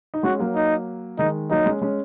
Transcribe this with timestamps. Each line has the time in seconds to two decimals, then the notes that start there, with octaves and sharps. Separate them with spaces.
0.14 D#4
0.23 G#3 C#4 F#4
0.39 F#3 A#3
0.56 D#4
1.19 D#3 G#3 D#4
1.50 F#3 A#3 D#4
1.66 G#3 C#4
1.82 G#3 C#4